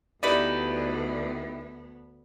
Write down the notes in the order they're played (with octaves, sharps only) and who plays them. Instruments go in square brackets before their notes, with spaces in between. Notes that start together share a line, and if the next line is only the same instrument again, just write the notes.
[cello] D2 B3 [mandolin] D#4 E4 B4 [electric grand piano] G4 D5